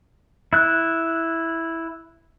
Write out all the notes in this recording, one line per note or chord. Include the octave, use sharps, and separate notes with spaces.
E4 F#6